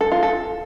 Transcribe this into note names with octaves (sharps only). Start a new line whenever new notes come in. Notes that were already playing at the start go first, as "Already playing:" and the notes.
A4
F4
A4